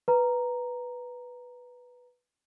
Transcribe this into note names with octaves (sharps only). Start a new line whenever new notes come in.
B4 A#5